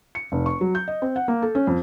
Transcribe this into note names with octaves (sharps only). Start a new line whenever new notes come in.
C#7
F1
C#6
F#3
G6
D#5
C4
F#5
A#3
A4
C#4
F2